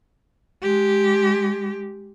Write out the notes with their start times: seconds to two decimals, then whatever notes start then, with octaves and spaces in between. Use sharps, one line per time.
0.62 G#3 G4